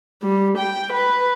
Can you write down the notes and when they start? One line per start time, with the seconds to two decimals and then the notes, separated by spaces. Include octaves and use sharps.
0.23 G3
0.58 G5
0.93 B4